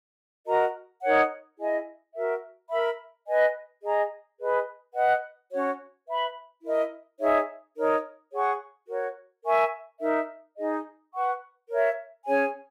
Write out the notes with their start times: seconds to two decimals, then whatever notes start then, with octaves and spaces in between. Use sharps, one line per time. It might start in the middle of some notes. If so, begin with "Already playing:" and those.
0.45 F#4 A#4 D#5 A#5
1.02 D#4 A#4 C#5 F#5
1.57 E4 G#4 D#5 G#5
2.13 F#4 A#4 E5
2.70 A#4 E5 B5
3.26 B4 D#5 G#5
3.82 G#4 D#5 A#5
4.38 G#4 B4 D#5
4.94 B4 D#5 F#5
5.50 C#4 F#4 C#5
6.06 B4 E5 B5
6.63 E4 A#4 D#5
7.19 D#4 G#4 C#5 E5
7.75 D#4 A#4 C#5
8.32 G#4 C#5 F#5 C#6
8.88 F#4 A#4 C#5
9.44 A#4 E5 G#5 C#6
10.00 D#4 A#4 E5
10.56 D#4 G#4 D#5
11.13 B4 F#5 C#6
11.68 A#4 C#5 E5
12.25 C#4 G#4 C#5 G#5